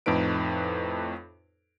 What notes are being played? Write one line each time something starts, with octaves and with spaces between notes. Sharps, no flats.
F2 A2 D#4 B4 D7